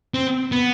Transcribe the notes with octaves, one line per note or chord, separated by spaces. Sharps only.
C4
B3